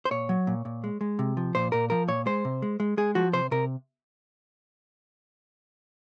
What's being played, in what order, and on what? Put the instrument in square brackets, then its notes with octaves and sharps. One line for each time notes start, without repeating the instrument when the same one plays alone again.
[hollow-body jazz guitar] C5
A#2 C#5
F#3
A#2
A#2
G#3
G#3
C3
F3
A#2 C5
A#2 A#4
F3 A#4
A#2 C#5
G#3 C5
C3
G#3
G#3
G#3 G#4
F3 F#4
C3 C5
C3 A#4